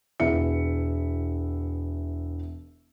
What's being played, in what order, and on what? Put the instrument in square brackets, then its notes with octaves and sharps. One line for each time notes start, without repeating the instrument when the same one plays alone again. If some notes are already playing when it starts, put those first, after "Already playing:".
[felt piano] E1 B3 E4 E5 C#7